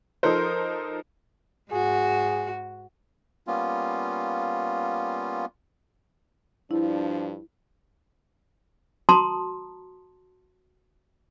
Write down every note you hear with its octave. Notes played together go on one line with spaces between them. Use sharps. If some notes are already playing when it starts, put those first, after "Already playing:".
F3 D#4 A4 A#4 C5
G#2 F#4 G#4
G3 A#3 B3 C#4 F4
G2 F3 D4 E4
F#4 A5 A#5 C6 D#6